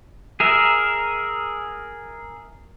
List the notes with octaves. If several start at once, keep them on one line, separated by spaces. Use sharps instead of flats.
G#4 A#4 E5